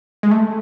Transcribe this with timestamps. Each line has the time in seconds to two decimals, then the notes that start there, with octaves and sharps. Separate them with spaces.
0.23 G#3
0.31 A3